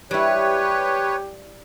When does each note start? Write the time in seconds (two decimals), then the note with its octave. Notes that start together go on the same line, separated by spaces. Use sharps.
0.11 G3 E4 G4 B4 C#5